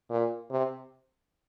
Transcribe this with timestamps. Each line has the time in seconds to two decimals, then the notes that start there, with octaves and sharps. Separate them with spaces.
0.10 A#2
0.51 C3